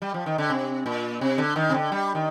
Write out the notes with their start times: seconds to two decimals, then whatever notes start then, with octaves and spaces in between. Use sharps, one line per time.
0.02 G3
0.14 F3
0.26 D#3
0.38 D3
0.50 C3
0.86 A#2
1.21 C3
1.38 D3
1.56 D#3
1.69 C3
1.74 D3
1.92 G3
2.15 D#3